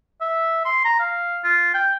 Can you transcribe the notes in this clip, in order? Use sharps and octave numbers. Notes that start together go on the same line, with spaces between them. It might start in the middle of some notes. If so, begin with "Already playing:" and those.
E5
C6
A#5
F5
F4
G5